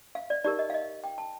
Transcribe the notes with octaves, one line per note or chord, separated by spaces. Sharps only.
F5
D5
D#4 G4 A#4 D5
D#5
F5
D#5
G5
A5